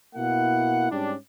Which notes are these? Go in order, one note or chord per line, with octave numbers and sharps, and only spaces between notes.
B2 A#3 E4 F#5
G#2 G3 C#4 D4